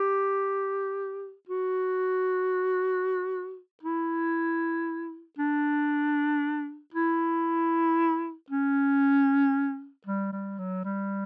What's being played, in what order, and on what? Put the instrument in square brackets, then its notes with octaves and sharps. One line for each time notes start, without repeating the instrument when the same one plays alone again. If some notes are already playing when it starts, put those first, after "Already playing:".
Already playing: [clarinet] G4
F#4
E4
D4
E4
C#4
G3
G3
F#3
G3